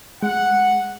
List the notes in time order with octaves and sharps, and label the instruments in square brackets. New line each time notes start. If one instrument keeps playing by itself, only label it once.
[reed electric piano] G#3 [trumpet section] F#5